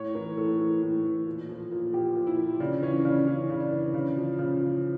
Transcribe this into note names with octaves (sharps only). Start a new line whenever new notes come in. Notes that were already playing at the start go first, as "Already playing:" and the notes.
Already playing: A2 C#5
E3 A#4
A2 A4
E3
A2
E3
A#2
F3
A#2
F3 G4
A#2
E4
F3
C#3 D4
E3 C#4
C#3 D4
E3 C#4
C#3
D4
E3
C#3
F3
C#3
F3